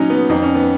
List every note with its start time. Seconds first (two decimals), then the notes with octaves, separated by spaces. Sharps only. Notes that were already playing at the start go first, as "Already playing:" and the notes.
Already playing: A#2 F#3 C#4 D#4
0.10 B3
0.29 F2 D#4
0.43 C#4
0.55 B3